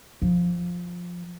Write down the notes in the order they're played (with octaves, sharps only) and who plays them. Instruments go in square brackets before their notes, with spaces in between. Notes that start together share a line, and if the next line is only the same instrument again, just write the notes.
[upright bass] F3